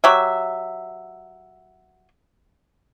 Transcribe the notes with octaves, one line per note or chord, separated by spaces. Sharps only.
F#3 G4 E5